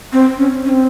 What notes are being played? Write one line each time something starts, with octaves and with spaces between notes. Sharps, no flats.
C4
C#4
C#4
C4